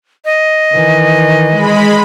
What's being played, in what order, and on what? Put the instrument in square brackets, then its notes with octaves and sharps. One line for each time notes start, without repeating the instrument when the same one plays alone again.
[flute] D#5
[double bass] D#3 E3
[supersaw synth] G#3 B5